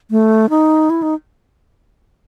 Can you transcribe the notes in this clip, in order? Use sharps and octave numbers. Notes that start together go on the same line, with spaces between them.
A3
D#4
E4
D#4